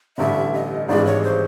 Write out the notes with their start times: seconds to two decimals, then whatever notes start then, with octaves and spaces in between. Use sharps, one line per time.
0.18 A1 G2 D3 E5
0.53 D#5
0.88 G#1 G2 E3 G#3 D5
1.06 C#5
1.23 C5